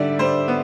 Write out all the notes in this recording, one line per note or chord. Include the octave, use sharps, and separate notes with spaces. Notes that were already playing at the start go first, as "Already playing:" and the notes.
Already playing: D3 G3 D5 E5
G3 C5
B3